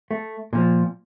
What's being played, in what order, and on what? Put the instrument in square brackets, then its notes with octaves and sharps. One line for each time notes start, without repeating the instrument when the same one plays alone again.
[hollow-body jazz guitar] A3
A#2 F3